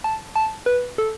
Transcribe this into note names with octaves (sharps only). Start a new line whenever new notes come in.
A5
A5
B4
A4